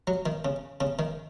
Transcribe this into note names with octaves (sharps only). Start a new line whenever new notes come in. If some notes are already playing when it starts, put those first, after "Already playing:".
F#3
D#3
C#3
C#3
D#3